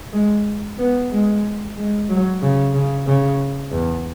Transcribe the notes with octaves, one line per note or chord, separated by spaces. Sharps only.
G#3
B3
G#3
G#3
F#3
C#3
C#3
C#3
E2